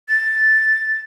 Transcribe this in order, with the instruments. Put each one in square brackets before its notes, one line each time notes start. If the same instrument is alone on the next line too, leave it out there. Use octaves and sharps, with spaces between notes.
[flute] A6